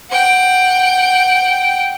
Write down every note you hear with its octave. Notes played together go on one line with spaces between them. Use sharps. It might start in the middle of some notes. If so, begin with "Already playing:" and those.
F#5 G5